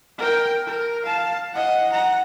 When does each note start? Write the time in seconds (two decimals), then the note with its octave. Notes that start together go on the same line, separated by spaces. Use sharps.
0.18 A#4 G5
0.67 A#4
1.04 F5 A5
1.53 D#5 F#5
1.90 F#5 A#5